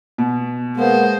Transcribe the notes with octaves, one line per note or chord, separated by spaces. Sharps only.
B2
G#3 A#3 B3 C5